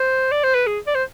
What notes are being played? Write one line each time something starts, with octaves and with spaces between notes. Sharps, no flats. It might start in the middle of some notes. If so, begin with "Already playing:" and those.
Already playing: C5
D5
C5
B4
G#4
D5
C5